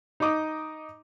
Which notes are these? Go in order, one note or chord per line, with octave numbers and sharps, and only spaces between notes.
D#4 D#5 D6 D#6